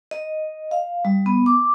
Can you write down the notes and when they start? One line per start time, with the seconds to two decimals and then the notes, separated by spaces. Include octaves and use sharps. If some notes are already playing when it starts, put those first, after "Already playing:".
0.11 D#5
0.71 F5
1.05 G3
1.26 B3
1.46 D6